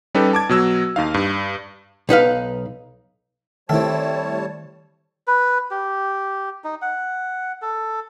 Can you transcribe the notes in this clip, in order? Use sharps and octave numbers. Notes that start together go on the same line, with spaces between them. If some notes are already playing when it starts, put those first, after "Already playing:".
G3 C#4 D#4 G4 A4 B4
A5 D6 G#6
B2 F#3 E6
D#2 D#4 F5
G2
B1 D#4 B4 F5
D#3 G3 A3 C4 E4 A4 C#5 A5
B4
G4
D#4
F#5
A4